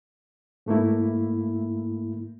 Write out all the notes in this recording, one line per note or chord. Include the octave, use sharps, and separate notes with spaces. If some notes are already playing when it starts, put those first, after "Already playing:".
G#2 A3 A#3 E4